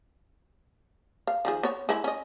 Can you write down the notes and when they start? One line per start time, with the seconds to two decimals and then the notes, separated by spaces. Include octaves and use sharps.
1.27 F5
1.45 D#3 F3 G#4
1.63 B3 C#5
1.89 G#3 E4
2.04 C#4 D#5